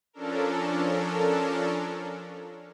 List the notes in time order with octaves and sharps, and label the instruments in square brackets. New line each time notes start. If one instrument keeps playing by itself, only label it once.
[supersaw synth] F3 C#4 D4 A4 A#4